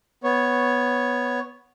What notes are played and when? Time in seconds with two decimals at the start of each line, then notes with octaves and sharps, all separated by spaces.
0.24 B3 C#5